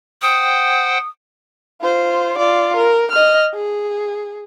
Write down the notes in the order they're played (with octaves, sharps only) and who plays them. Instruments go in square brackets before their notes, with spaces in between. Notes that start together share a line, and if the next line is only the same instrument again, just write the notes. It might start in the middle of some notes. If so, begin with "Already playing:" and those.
[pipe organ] C5 F#5 G5 [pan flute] D#6
[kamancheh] F4 C5
F4 D5
A#4
D#5 F6
G#4